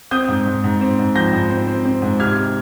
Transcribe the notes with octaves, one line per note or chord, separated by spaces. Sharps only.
C4 D#6 G6
G#2
G#2
G#2
C4
G#2
F3 G6 A#6
G#2
C4
C4
C4
G#2
C3 F6 G#6